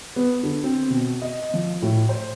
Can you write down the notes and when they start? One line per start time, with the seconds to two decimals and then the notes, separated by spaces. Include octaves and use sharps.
0.16 B3
0.43 D3
0.64 C4
0.90 B2
1.22 D#5
1.54 F3
1.82 A2
2.09 C5